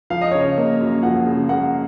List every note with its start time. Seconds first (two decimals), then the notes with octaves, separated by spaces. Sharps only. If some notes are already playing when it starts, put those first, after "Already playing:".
0.10 F3 F5
0.21 D#5
0.31 C#3 C#5
0.40 D#5
0.58 A#3
0.81 F#2
1.03 F3 F#5
1.26 C#3
1.49 A#3 F#5